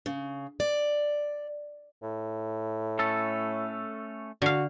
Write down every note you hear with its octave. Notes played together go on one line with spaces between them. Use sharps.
C#3
D5
A2
A3 C#4 A4
D3 F#4 F5